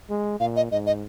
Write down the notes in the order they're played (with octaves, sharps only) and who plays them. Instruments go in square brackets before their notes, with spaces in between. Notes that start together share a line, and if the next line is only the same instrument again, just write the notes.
[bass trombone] G#3
[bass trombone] A#2 [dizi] F5
[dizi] D#5
[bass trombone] G#2 [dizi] D#5
[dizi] D#5